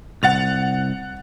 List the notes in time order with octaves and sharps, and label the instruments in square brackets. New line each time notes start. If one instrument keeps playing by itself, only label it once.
[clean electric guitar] C2 [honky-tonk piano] F#5 A6 F7